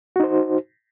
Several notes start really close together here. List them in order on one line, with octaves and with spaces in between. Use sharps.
F#4 D#4 C5